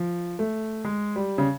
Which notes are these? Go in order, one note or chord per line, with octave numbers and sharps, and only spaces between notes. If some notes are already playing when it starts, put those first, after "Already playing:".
Already playing: F3
A3
G#3
G3
C#3